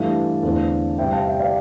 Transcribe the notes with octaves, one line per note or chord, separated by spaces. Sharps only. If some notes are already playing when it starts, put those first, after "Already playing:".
Already playing: G2 E3 A3 F5 A5
E2 D3 A3 C4
C3 G3 C4 E5 G5
F5 A5
E5 G5
D5 F5